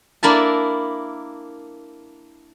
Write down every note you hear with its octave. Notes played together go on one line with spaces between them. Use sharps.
A#3 D4 E4 A#4 E5 A5